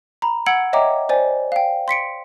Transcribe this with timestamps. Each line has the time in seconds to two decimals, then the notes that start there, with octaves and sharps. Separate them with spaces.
0.22 A#5 B5
0.46 F#5 E6 G#6 C#7 D7 F#7
0.73 C#5 D#5 E5 G5 A#5 D6
1.09 C5 D5 G#5
1.52 F5 G5
1.88 C6 B6 C#7 D7